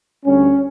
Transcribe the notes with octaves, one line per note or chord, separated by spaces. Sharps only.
D2 D3 G3 C#4